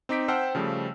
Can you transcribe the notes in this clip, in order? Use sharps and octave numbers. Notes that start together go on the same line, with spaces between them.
C4 D#4 D6 B6 D7
C5 F#5 G5 A5 E6 F6
C#3 F3 G3 A3